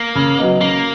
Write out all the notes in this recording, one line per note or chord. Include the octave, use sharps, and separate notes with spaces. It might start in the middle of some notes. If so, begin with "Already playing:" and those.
Already playing: A#3
C#3
F#3 B3 D#4
C#3 A#3